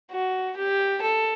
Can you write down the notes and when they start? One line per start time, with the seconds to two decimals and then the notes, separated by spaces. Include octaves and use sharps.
0.11 F#4
0.56 G4
1.02 A4